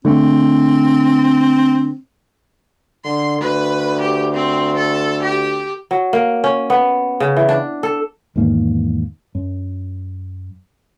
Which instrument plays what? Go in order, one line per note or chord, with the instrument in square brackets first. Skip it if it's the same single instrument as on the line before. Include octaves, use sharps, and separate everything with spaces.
[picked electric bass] D3 A3 [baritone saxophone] C4
[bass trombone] D3 [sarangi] C6
[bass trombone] D2 [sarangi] B4
[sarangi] G4
C4
A4
G4
[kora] F#3
A#3
C#4
B3
C#3
E3
D4
A4
[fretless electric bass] E2 G#2 D#3 A#3
F#2